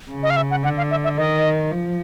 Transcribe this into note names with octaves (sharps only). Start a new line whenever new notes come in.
C#3
D#5
F5
E5
F#5
D3 F#5
F5
E5
E5
D#3 D#5
F3